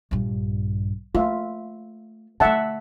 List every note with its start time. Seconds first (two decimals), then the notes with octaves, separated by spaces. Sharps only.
0.11 A#1 G2
1.15 A3 F4 E5
2.40 D3 A3 E5 F#5 A5